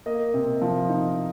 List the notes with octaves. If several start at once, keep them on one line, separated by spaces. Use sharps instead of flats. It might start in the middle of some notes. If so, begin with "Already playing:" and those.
A#3 D#5
C3
F3
D#4